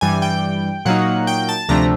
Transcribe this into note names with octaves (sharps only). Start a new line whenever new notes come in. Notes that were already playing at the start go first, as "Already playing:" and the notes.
G2 E3 G3 G#5
G5
A#2 F#3 A#3 D#4 F#5
G5
A5
D2 C3 F3 A3 D4 A#5